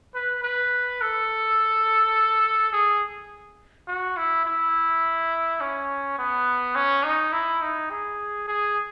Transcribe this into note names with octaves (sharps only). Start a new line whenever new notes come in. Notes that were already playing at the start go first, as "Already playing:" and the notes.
B4
B4
A4
G#4
F#4
E4
E4
C#4
B3
C#4
D#4
E4
D#4
G#4
G#4